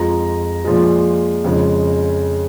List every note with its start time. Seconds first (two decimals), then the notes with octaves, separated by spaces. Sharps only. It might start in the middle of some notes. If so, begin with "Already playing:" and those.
Already playing: F2 F3 G#3 A#5
0.65 A#2 F3 G#3
1.44 F2 C#3 G#3